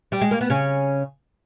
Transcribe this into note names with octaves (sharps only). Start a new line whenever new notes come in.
G3
G#3
A#3
B3
C#3 C#4